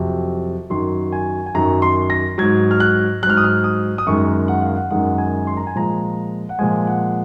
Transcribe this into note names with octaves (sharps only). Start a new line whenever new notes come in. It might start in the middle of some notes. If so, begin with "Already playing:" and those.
Already playing: F2 C3 F#3
F#2 D#3 F#3 C6
G#5
G#5
F#2 D#3 F#3 A#5
C6
A#6
G#2 F#3 G#6
F6
F#6
G#2 F#3 F6 F#6
D#6
F6
D#6
D#6
F#2 D#3 G#3 C#6
F#5
F5
F#5
F#2 D#3 G#3 F#5
G#5
C6
A#5
G#5
A#2 F3 G#3 A#5
F#5
A#2 F3 G#3 G#5
F#5